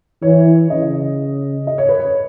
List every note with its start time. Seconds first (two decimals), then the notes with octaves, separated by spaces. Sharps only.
0.22 E3 C#5
0.70 C#3 D#5
1.67 D#5
1.78 C#5
1.89 B4
2.00 C#5